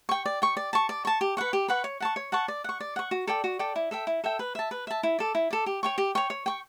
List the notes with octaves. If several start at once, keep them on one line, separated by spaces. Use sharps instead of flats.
G5 C#6
D5
G5 C#6
D5
A5 C#6
D5
A5 C#6
G4
B4 F#5 C#6
G4
B4 F#5 C#6
C#5
F#5 A5 C#6
C#5
F#5 A5 C#6
D5
F#5 C#6
D5
F#5 C#6
F#4
A4 D5 G5
F#4
A4 D5 G5
E4
A4 E5 G5
E4
A4 E5 G5
B4
E5 A5
B4
E5 A5
E4
A4 D5
E4
A4 D5
G4
C#5 G5 C#6
G4
C#5 G5 C#6
C#5
G5 C#6